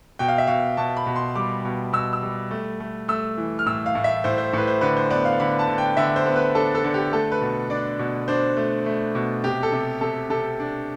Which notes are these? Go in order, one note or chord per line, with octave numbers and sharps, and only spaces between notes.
B2 G5
F5
E5
B2 F5
B2 A5
B5
B2
C6
G3 D6
B2
B2 E6
E6
G3
A3
A3
A3 E6
E3
F6
A2 E6
F5
A2
E5
A2 C5
C5
A2 B4
C5
D3 B4
C5
B3 D5
F5
D3 B5
A5
D3
G5
D3 E5
C5
B3
B4
D4 A4
A4
D3
G4
A3 A4
B4
B2
D4 D5
B2
D4 C5
A3
A3
B2
C3 G4
A4
C3
C3 A4
C3 A4
D4